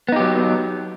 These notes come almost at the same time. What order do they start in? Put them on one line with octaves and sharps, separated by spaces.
B3 D#4 G4 F#3